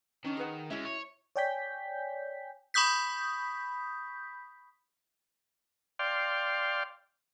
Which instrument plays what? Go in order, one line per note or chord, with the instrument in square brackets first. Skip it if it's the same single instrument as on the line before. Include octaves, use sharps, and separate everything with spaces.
[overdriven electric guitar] D#3 [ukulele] C#4 D4
[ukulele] G#4 B4 F#5
[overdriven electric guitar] G#3 C#4 [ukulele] E4 F#4 E5
[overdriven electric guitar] C#5
[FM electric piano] C#5 D5 G5 G#5 G6 B6
[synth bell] B5 C#6 D#6 G6 B6
[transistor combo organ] D5 F5 G5 C6